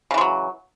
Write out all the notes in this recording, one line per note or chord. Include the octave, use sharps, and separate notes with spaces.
C#3 E3 F#3 G#3